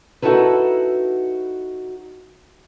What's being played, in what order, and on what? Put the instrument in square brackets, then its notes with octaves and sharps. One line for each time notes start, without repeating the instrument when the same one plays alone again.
[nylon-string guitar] D#4 E4 F#4 A4 B4